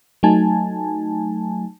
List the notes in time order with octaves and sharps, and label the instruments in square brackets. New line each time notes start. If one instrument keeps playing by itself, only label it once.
[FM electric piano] F#3 A3 D#4 G#5 A5